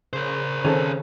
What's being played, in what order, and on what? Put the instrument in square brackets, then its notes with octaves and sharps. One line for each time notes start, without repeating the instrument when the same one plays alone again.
[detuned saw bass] C#3 [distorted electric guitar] A#4 C5
[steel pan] D#3 G#4 A4 [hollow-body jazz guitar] C4 C#4